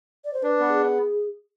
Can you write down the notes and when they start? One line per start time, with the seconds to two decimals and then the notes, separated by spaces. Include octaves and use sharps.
0.25 D5
0.34 C5
0.43 D4 B4
0.60 B3
0.69 G#4